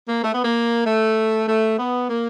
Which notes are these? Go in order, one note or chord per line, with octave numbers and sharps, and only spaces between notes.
A#3
A3
B3
A#3
A3
A3
B3
A#3